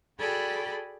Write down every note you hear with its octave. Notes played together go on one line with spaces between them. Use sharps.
F#4 G#4 A4 D5 G5 B5